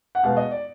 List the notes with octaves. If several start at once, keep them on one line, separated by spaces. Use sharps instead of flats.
F#5
B2 G#3 B3 F5
D#5
D5